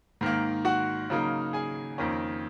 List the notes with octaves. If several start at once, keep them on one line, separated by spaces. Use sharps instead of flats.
G#2 D#3 A#3
F#4 F#5
C#3 F#3 A#3 D#4
G#4 G#5
F2 D#3 A#3 C#4